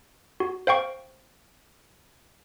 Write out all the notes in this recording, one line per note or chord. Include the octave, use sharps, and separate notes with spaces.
F#4
C5 F5 G5 C#6